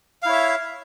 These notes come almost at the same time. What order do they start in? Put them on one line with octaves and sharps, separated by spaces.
F5 E4 C#5 E5